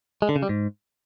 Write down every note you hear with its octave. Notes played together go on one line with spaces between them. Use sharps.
G#3
D3
C#3
G3
G#2